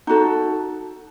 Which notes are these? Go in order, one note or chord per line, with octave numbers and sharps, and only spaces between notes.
D#4 F#4 A4